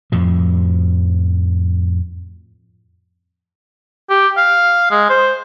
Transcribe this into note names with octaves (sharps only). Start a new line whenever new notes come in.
F2 A2 F3
G4
F5
G#3
C5